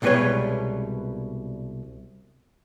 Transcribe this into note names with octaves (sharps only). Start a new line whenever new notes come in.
C2 B2 G3 G#3 B4 C#5